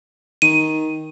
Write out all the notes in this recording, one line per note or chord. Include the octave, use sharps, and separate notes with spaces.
D#3 D#7